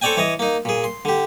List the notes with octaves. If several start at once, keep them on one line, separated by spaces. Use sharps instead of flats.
C4 A4 C#5 D5 G5 G#5
E3 C#5 D#5
A#3 D#4
A#2 G#4
C6
D3 G4